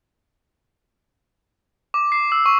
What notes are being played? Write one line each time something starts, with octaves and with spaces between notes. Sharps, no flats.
D6
C7
E6
C#6